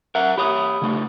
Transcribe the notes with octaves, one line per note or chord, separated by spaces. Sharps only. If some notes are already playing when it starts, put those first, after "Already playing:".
A#4 E5 F#5 A#5
G4 C#5 B5 D#6
C#3 A3